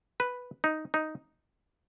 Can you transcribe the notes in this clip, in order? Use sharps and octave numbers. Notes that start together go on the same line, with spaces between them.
B4
D#4
D#4